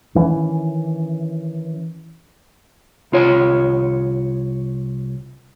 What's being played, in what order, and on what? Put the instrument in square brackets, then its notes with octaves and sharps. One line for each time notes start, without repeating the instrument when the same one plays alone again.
[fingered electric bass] D#3 E3 A3 C#4
[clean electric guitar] C2 F4 C#5